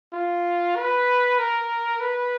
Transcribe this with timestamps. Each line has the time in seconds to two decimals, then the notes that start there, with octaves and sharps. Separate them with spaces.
0.13 F4
0.76 B4
1.39 A#4
2.00 B4